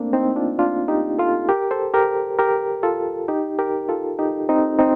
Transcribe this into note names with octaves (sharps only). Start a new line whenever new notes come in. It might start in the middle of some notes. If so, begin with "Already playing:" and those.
Already playing: A3 A#3 C4 D4
C4 D#4
D4 F4
D4 F4
D#4 G4
F4 A4
G4 A#4
A4 C5
G4 A#4
G4 A#4
F4 A4
D#4 G4
G4 A#4
F4 A4
D#4 G4
C4 D#4
C4 D#4